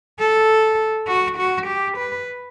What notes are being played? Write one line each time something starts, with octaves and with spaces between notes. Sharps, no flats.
A4
F#4
F#4
G4
B4